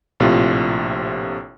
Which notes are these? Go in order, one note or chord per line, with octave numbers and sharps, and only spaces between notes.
A#1 A2 C3 F4